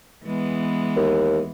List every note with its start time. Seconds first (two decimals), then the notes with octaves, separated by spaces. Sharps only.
0.25 E3 G#3 B3
0.96 D#2